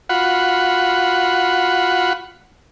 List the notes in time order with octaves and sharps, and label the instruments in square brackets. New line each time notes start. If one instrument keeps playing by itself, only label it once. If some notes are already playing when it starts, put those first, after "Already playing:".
[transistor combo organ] F4 F#4 F#5 B5